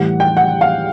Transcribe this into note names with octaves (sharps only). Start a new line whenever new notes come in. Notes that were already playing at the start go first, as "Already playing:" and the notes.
Already playing: A2 E3 G3 F#5
G5
F#5
F5